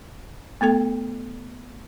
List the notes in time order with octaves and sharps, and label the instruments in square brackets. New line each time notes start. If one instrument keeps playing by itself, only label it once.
[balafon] A3 B3 A4 G5